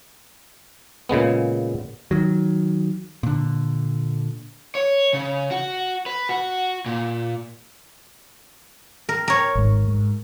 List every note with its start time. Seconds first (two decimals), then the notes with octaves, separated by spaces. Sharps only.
1.09 A#2 C#3 G#3 B3
2.11 D#3 F#3
3.23 A#2 D3
4.75 C#5
5.13 C#3
5.51 F#4
6.06 B4
6.29 F#4
6.86 A#2
9.09 A#4
9.28 A#4 C#5
9.55 G#1 G#2
9.88 G#2